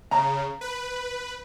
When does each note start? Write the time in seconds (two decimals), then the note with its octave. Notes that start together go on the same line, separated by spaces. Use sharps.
0.11 C#3 A#5
0.61 B4